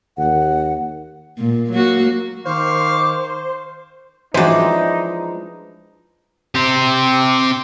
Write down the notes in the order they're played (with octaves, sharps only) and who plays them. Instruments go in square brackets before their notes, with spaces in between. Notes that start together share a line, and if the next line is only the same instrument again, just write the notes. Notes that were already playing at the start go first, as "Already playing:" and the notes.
[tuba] D#2 [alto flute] F#5
[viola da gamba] A#2
F#3 A#3 F#4
[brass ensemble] D#3 [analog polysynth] C5 [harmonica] F5 C#6 D6
[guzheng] E3 D4 [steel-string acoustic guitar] F3 G#3 [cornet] D#4 [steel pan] F#4 C5
[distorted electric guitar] C4 G4